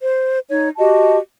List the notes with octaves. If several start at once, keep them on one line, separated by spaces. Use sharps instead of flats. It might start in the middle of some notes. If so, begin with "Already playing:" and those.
C5
D#4 C#5
F#4 G4 D#5 A5